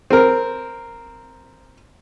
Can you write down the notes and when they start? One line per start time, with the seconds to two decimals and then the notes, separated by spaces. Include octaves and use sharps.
0.10 C4 A#4